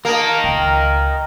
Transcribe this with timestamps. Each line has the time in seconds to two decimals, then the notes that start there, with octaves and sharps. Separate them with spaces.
0.05 A#3 A#4 D#5 A5
0.44 C#2 G5